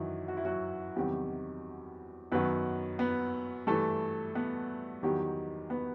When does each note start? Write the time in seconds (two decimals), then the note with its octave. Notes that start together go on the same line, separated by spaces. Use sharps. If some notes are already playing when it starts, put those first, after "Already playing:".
Already playing: F#2 D#3 E3 F#3 E4
0.28 F#4
0.37 E4
0.45 F#3 F#4
0.96 E2 C3 D#3 F#3 G3 G4
2.32 F#2 D#3 F#3 B3 B4
2.99 B3 B4
3.67 G2 E3 A3 A4
4.35 B3 B4
5.03 E2 D#3 F#3 G3 G4
5.70 B3 B4